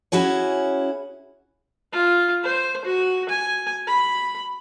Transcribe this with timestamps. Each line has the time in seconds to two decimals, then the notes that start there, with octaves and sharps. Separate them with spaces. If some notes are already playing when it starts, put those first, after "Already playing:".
0.12 C#4 E4 F#4 G#4 C#5
1.93 F4
2.43 C5
2.85 F#4
3.29 G#5
3.87 B5